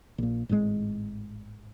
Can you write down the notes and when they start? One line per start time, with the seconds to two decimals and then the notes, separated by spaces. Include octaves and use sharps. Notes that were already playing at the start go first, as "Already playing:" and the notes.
0.18 A#1 A#2
0.49 G#1 A2 D3 G#3